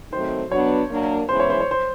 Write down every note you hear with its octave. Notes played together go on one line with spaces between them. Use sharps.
D#3 F#3 A3 C4 C5
F#3 B3 D4 C#5
F#3 A#3 D4
C#3 E3 G#3 B3 E4 C5
C#5
C5
C#5
C5